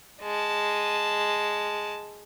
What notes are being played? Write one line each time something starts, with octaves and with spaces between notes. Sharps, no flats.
G#3 A5